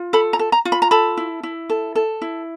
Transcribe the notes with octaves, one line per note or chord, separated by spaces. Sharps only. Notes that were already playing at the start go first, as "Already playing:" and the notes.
Already playing: F4
A4 B5
A#5
A4
A#5
F4
B5
A#5
A4 B5
E4
E4
A4
A4
E4